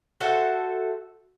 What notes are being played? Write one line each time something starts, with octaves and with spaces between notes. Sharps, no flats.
F#4 A4 C5 E5